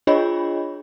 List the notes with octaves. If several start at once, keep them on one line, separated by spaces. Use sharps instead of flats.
D4 F4 G#4 C#5 D#5 B5